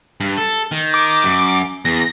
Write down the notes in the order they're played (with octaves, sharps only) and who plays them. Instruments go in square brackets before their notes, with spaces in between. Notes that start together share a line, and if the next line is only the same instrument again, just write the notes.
[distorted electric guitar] G2
A4
D#3
[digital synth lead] D6
[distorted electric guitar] F#2
[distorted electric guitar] E2 [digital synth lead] A#6